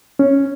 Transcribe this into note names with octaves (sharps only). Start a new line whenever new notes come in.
C#4